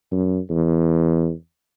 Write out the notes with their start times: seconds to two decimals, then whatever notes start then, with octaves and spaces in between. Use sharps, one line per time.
0.12 F#2
0.50 E2